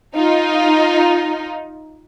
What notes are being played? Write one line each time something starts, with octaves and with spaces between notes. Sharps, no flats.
D#4 F4